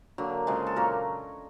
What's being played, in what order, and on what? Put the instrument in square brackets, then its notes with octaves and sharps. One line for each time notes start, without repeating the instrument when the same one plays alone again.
[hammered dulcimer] D3 F#3 A#3
C#3 F3 G#3
A4
A#2 F#3 A#3 A#4